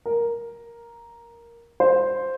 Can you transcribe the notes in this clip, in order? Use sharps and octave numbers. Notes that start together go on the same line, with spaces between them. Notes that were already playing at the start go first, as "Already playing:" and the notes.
A#4
C5